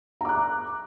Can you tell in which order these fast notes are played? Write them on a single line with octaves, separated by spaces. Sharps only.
A#5 D6 F#6